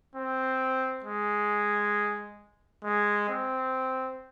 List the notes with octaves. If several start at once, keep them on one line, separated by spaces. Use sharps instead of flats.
C4
G#3
G#3
C4